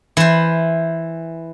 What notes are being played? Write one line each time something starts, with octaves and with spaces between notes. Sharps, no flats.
E3 C5